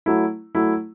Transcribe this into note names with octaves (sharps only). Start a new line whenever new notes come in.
F#3 A3 E4
F#3 A3 E4